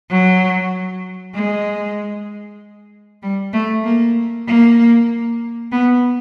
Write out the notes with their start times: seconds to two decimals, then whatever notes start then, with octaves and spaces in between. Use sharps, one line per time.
0.10 F#3
1.34 G#3
3.23 G3
3.53 A3
3.84 A#3
4.47 A#3
5.72 B3